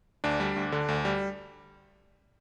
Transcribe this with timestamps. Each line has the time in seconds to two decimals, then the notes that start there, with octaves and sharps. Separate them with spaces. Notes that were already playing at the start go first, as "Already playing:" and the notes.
0.24 D2 D4
0.40 G3
0.56 D2
0.72 D3
0.88 D2
1.05 G3